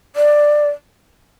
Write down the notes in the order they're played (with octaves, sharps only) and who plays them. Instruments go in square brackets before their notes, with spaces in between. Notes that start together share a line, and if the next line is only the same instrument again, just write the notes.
[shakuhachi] D5